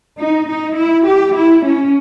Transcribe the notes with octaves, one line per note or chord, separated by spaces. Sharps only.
D#4
D#4
E4
G4
E4
C#4